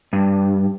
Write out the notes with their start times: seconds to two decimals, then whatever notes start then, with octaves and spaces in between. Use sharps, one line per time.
0.13 G2